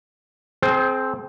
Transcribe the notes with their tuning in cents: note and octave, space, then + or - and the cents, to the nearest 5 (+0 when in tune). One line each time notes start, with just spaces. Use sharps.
C4 +0 G#4 +40 C5 +0